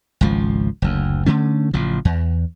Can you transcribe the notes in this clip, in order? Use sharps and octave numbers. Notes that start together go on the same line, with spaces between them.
G#1 C#2 F3
F#1 D2
D3 A3 C#4
A1 C#3 F3
E2